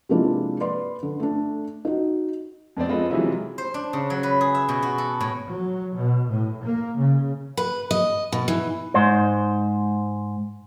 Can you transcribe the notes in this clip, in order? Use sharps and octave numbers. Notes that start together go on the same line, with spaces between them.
C3 F3 G#3 A#3 D4 E4
B4 D5 C6
D3
A3 D4
D#4 F#4
F2 B3 C4 D5
G#3 C4 F4 A4 B4 D#5
C3 E3 F#3 G#3 E4 F4
C5
D4
C#3
F#3
B4
G#4
E5
B2
F#4
A4
A2
F#3
B2
A2
A#3
C#3
B4
D#5
B2
E3
G#2 C5